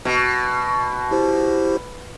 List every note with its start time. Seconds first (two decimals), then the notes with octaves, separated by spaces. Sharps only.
0.05 B2
1.11 E4 G4 C5